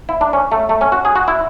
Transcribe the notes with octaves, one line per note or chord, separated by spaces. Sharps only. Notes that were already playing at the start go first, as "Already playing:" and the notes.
E4
D4
C#4
A3
A3
C#4
F#4
G#4
F#4
E4